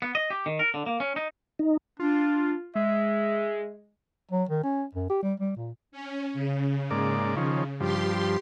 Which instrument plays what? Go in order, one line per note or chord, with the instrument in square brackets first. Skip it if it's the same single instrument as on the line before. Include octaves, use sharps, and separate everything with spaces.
[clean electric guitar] B3
D#5
G4
D#3
A#4
D3
A#3
C#4
D#4
[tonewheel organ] D#4
[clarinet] D4 [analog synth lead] F4
[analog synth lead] G#3 [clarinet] E5
[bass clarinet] F#3
D#3
C#4
F#2
G4
G3
G3
A#2
[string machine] C#4
C#3
[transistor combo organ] G#2 A#3 D5
D#3 F3 C#4
[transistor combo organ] G2 F3 [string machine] G4 C6